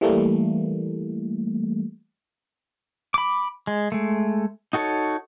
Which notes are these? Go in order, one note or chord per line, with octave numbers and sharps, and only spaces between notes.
E3 G3 A3 A#3
B5 D6
G#3
G#3 A3
D#4 F#4 A4 C#5